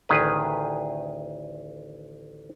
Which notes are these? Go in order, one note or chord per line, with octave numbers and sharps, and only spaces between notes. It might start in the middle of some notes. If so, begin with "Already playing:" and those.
A1 D2 D#3 G#4 B4